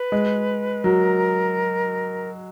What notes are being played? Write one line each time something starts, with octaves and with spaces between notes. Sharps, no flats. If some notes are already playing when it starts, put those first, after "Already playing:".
Already playing: B4
G#3
F#3 A#4